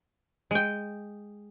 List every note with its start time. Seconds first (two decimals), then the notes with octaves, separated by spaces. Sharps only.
0.51 G#3 G5